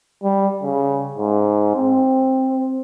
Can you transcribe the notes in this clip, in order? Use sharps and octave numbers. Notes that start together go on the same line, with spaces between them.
G3
C#3
G#2
C4